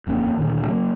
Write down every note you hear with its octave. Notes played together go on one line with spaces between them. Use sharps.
D#1 F2 A#3 C#4
D2 A#2 D#3
C#3 F#3 G#3 A#3